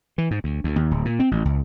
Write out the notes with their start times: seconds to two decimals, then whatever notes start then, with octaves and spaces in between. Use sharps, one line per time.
0.18 E3
0.31 G#2
0.44 D2
0.64 D2
0.76 D#2
0.91 D1
1.05 A#2
1.19 C4
1.31 A1
1.45 C#2